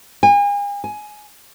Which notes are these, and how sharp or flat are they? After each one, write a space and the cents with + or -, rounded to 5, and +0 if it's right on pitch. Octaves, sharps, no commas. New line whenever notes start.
G#5 -40
G#5 +15